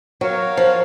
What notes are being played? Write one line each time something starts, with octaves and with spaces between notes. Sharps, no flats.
F#3 F#4 A#4 C#5 F5
F3